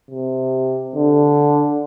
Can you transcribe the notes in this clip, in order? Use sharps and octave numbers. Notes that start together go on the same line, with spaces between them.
C3
D3